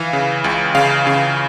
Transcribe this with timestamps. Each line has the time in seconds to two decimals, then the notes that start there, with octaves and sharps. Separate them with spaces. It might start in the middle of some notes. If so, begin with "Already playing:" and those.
Already playing: E3 F5
0.13 C#3
0.44 C#2
0.75 C#3 F5
1.07 C#3